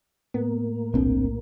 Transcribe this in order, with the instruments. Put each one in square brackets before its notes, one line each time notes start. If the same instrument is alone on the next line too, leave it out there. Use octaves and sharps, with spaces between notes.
[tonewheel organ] A2 A#3 [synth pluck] B3
[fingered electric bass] D#1 C4 D4 [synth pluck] B1